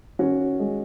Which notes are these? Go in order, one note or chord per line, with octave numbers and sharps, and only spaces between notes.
D#3 C#4 F#4
G#3